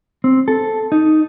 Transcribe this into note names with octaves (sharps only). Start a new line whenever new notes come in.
C4
A4
D#4